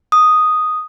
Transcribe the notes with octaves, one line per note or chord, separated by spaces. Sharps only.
D#6